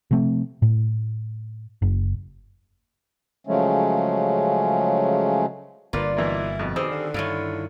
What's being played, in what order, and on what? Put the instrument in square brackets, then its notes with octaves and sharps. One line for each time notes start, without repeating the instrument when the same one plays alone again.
[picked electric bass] C3 F3 A3 C4
A2
F#1
[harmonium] C#3 F3 F#3 G#3 A3 C#4
[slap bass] G1 D3 [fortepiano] A#3 B4 [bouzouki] F4 D5
[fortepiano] B2 E3 A#3 [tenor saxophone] E4
[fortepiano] F2 B2
[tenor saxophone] B2 [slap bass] D#3 [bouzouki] G3 C4 G#4 [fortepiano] E6
[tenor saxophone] D3
[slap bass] G2 D#3 [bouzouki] E4 F4 C#5